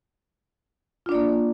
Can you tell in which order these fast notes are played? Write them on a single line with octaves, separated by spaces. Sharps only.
F4 D4 D5 A#3